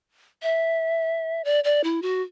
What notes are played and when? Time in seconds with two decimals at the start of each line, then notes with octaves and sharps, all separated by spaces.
0.43 E5
1.44 D5
1.64 D5
1.84 E4
2.02 F#4